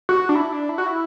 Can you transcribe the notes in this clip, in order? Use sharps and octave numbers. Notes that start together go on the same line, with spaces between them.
F#4
D4
E4
D4
E4
F#4
E4